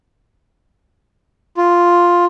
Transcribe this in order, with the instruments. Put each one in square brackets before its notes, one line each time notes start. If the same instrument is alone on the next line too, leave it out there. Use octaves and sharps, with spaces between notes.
[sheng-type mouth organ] F4